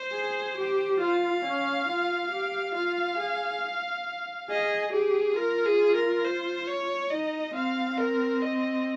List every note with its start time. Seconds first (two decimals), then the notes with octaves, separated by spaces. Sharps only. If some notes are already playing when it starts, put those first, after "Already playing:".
Already playing: C5
0.13 G#4
0.57 G4
1.01 F4 F5
1.45 C#4
1.88 F4
2.31 G4
2.75 F4 F5
3.18 G#4
4.49 G#4 D#5
4.92 G4 G#4
5.36 F4 A#4
5.66 G#4
5.95 A#4
6.24 C5
6.67 C#5
7.10 D#4 D#5
7.55 C4 F5
7.98 A#4
8.42 D#5